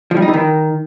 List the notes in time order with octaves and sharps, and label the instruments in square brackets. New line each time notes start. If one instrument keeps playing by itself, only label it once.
[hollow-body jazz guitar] F3
G3
D#4
E3
D#3